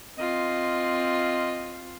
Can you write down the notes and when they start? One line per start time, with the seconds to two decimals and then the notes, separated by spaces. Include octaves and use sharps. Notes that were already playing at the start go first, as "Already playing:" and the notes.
0.18 C4 F4 D#5